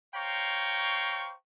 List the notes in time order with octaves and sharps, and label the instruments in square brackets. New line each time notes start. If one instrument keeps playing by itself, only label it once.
[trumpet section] C5 C#5 F5 G5 A#5 C#6